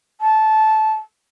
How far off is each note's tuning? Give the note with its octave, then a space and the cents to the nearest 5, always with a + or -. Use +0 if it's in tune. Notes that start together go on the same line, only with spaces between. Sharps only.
A5 -15